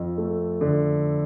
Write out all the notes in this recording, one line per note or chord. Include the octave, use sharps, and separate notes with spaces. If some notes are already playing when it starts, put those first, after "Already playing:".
Already playing: F2
A3
D3